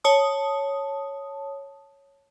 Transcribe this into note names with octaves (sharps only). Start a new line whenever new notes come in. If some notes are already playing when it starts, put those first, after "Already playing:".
C#5 A5 D#6